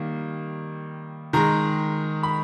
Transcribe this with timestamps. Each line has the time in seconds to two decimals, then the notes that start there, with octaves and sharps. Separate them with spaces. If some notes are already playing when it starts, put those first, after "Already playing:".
Already playing: D#3 G3 A#3
1.33 D#3 G#3 A#5
2.23 B5